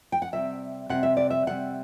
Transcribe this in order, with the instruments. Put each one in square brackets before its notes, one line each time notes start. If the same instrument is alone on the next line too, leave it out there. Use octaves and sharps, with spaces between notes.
[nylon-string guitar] G5
F#5
C3 G3 E5
C3 G3 F#5
E5
D5
E5
C3 G3 F#5